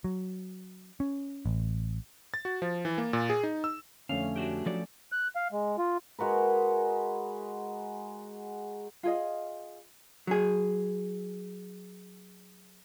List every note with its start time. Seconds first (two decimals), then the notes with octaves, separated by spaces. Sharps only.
0.04 F#3
1.00 C#4
1.46 A1
2.34 A6
2.45 F#4
2.62 F3
2.85 E3
2.98 A#3
3.13 A#2
3.30 G#4
3.43 D#4
3.64 E6
4.09 F2 D3 A3 C#4 F5
4.36 D4 F#4 G4
4.66 F3 F#3 A4 D5
5.12 F#6
5.36 F5
5.52 G#3
5.78 F4
6.19 G#3 F#4 A#4 B4
9.03 F4 G#4 D#5
10.27 F#3 G#4